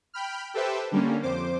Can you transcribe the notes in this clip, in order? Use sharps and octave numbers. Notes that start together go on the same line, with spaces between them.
G5 B5 F6
G4 A4 B4 C5 E5 G5
D3 G3 A#3 C#4
F2 C5 D6